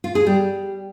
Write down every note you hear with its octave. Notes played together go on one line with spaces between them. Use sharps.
F4
G#4
G3